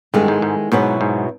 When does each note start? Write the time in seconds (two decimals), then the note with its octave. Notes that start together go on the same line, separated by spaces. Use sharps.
0.14 G2 D#3 G#3 B3 E4 A4
0.28 G#2
0.42 G#2
0.72 G#2 B2 F#3 B3 E4
1.01 G#2